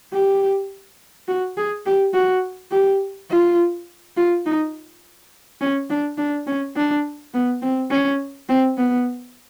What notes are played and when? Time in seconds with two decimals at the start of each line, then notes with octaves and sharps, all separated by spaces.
0.13 G4
1.28 F#4
1.57 G#4
1.86 G4
2.14 F#4
2.72 G4
3.31 F4
4.17 F4
4.46 D#4
5.61 C#4
5.90 D4
6.18 D4
6.47 C#4
6.76 D4
7.34 B3
7.62 C4
7.90 C#4
8.49 C4
8.77 B3